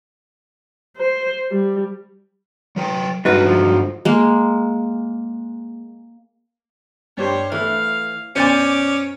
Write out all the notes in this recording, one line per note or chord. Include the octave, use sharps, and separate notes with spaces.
C5
G3
F#3 A#4 G5
G2 D3 G#3 D#4 E4 F#4 B4
F3
G#3 A#3
G2 G4 C5 C#5 G5
E3 A3 A4 F5
F#2 B2 C#4 C5 D5 G#5 D6